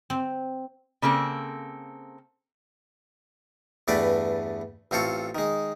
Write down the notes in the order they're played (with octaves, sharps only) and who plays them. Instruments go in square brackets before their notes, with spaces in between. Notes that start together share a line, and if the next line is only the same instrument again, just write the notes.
[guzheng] C4
[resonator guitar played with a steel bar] C#3 A#3 C4 A4
[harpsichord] E2 G2 A3 B4 D5
A1 C4 F4 A4 C#6
D#3 G#3